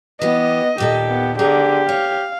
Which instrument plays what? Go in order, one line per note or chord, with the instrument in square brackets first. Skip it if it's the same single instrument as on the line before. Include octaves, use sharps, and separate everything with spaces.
[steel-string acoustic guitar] E3 G4 [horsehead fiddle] B3 [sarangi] D#5
[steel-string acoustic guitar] D#2 A#2 A4 [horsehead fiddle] G4
[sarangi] B3
[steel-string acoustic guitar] D2 G#4 A#5 [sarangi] D3 [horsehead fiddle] G4
[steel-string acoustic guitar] C#5 [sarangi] F5